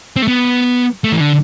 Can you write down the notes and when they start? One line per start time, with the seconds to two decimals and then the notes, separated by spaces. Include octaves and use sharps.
0.16 C4
0.22 A3
0.28 B3
1.04 A3
1.12 E3
1.20 D3